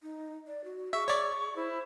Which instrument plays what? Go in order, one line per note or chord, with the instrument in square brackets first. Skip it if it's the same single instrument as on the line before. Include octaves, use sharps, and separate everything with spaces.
[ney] D#4
D5
F#4
[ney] G#4 [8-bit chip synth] E5 [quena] C#6
[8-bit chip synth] C#5 D5
[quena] E4 [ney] C5